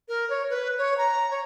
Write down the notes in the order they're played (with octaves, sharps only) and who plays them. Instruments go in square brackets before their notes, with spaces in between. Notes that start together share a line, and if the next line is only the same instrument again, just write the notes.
[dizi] A#4
C#5
B4
C#5
A#5
C#5